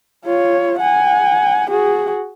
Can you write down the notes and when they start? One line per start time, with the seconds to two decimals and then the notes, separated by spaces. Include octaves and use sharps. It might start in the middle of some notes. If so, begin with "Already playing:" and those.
0.25 F4 C#5
0.79 F#5 G#5
1.70 F#4 G#4